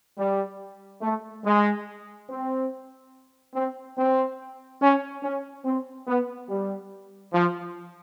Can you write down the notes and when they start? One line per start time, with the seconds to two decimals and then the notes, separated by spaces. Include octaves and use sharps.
0.17 G3
1.02 A3
1.45 G#3
2.29 C4
3.55 C4
3.97 C4
4.81 C#4
5.23 C#4
5.65 C4
6.07 B3
6.49 G3
7.33 F3